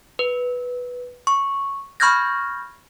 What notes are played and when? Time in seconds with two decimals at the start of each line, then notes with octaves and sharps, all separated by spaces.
0.19 B4
1.27 C#6
2.00 B5 C#6 F6 G6 G#6 A#6